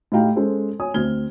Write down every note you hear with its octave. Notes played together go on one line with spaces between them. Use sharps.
A2 D#4 G4 F5 G5 A#5
G#3 C#4 A4 C5
C#5 G#5 D#6
D2 C4 F6 G#6 G7